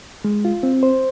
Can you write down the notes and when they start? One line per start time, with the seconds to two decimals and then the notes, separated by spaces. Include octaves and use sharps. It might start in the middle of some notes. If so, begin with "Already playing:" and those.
0.25 G#3
0.45 F4
0.63 C4
0.83 C5